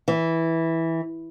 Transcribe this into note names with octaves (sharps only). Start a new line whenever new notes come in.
E3